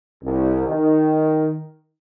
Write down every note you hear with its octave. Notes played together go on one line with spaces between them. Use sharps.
C2
D#3